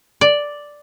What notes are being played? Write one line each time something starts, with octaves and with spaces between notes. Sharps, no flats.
D5